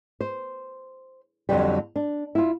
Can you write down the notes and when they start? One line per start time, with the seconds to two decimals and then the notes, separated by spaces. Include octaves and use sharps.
0.21 C5
1.49 F2 D3 F#3 G3
1.96 D4
2.35 E4 F4